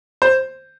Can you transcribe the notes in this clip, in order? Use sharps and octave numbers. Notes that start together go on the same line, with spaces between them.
C5